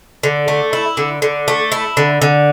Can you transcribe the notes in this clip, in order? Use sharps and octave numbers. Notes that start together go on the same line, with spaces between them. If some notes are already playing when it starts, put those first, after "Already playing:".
D3
A3
E4
D3
D3
A3
E4
D3
D3